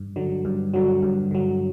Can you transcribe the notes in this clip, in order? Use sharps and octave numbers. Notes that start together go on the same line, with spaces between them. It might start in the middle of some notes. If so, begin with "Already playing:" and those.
Already playing: G2
D3 F#3
G2
D3 F#3
G2
D3 F#3